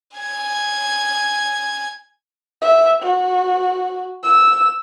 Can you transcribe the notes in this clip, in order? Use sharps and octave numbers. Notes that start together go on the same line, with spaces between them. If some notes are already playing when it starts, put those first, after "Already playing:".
G#5 G#6
E5
F#4
E6